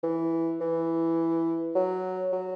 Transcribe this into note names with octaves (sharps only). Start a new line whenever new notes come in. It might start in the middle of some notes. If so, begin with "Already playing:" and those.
E3
E3
F#3
F#3